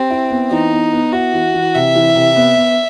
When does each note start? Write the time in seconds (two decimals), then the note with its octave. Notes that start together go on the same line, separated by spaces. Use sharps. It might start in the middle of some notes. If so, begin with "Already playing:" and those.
Already playing: C4 G4
0.10 E4
0.31 B3
0.51 E3 D#4
0.72 B3
0.92 B3
1.13 E4 F#4
1.33 E3
1.54 E3
1.75 C3 E5
1.95 E3
2.16 C3
2.36 B3
2.57 B3